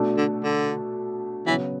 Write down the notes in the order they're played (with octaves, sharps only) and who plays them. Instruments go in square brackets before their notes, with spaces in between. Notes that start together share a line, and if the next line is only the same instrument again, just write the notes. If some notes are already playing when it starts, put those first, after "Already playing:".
Already playing: [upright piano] B2 A3 D4 A4
[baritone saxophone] D3
D3
[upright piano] C#3 F#3 B3 [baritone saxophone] E3